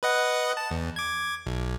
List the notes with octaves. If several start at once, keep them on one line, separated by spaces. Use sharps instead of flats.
B4 D#5 F#5
A5
E2
D6 G#6
B1